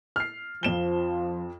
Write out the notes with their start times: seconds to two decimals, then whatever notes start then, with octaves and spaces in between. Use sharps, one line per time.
0.16 F6 C7
0.63 F2 F3 E7 G7